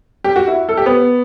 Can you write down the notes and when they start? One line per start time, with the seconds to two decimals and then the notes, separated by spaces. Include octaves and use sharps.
0.24 G4
0.36 F#4
0.48 E4
0.69 A4
0.77 G4
0.86 B3